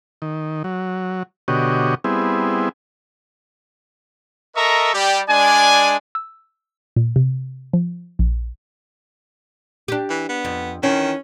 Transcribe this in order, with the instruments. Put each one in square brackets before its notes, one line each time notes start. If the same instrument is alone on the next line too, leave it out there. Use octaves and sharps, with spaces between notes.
[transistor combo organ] D#3
F#3
B2 D3 F#4 G4 C#5 D#5
G3 B3 C4 E4 G#4
[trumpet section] A4 A#4 D#5 E5 A#5 C#6
G3 G4 D5
G#3 D4 D5 G#5
[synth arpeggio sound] E6
A#2
C3
F3
A#1
[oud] D4 G4
[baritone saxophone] E3
B3
[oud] F2
[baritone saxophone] D#3 [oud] E3 [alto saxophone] C#4